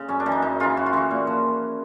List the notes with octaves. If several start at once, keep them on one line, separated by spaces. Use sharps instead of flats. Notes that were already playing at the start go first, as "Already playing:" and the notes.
Already playing: C#3
F#2 C#4
D4
C#3 E3
D#4
F#2 D#4
C#3 E3 F4
F#2 F#4
F4
C#3 E3 F#4
A#2
F3